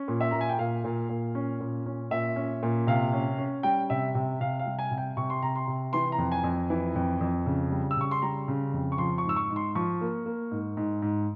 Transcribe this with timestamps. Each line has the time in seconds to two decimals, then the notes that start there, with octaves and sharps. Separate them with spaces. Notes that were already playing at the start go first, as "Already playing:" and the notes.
Already playing: C#4
0.08 A#2
0.20 E5
0.31 A#2 A#5
0.41 G#5
0.49 G5
0.59 A#2 F5
0.84 A#2
1.09 A#2
1.35 C#4
1.61 A#2
1.86 C#4
2.11 A#2 E5
2.36 C#4
2.63 A#2
2.87 C3 F5
3.13 C#4
3.38 C#4
3.63 G3 G5
3.90 C3 E5
4.15 C3
4.40 C3 F5
4.59 F5
4.66 G3
4.79 G#5
4.91 C3
4.98 G5
5.17 C3 C#6
5.30 C6
5.42 C3 A#5
5.56 C6
5.68 C3
5.93 E3 C6
6.12 A#5
6.18 F2
6.32 G#5
6.44 F2
6.70 E3
6.95 F2
7.21 F2
7.46 C#3
7.71 G3
7.91 E6
7.97 C#3 C#6
8.11 C6
8.22 G3 A#5
8.48 C#3
8.73 F2
8.92 C#6
8.98 F3 C6
9.18 C#6
9.25 G#2 E6
9.36 C#6
9.50 G#2
9.56 C6
9.75 F3 C#6
10.01 A#3
10.26 A#3
10.51 G#2
10.77 G#2
11.02 G#2